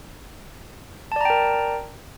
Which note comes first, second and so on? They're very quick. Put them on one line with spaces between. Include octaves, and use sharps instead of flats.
A5 D5 A#5 G5 A#4